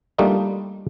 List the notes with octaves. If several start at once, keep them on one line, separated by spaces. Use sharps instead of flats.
G3 A3 A#3 D4 D#4 F4